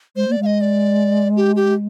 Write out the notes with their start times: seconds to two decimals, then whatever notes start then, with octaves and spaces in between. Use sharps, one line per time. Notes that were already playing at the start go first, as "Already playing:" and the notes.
0.16 G#3 C5
0.28 A#3 D5
0.39 G#3 F5
0.46 D#5
0.61 D5
1.36 G4
1.56 G4